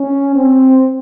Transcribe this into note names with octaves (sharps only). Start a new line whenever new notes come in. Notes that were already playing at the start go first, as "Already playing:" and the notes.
Already playing: C#4
C4